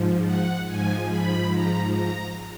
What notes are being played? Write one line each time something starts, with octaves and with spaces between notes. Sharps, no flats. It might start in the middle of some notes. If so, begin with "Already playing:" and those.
Already playing: G#2 F3
F#5
G#2 F3 G#5
B5
A#5
A#5